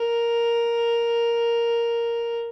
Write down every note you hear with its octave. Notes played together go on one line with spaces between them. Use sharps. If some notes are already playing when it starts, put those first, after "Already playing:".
Already playing: A#4